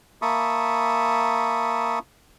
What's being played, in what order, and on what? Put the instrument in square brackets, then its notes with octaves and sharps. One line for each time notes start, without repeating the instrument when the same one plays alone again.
[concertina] A#3 E5 A5 B5 C#6 D#6